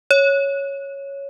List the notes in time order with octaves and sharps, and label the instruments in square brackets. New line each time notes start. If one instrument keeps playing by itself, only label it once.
[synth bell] C#5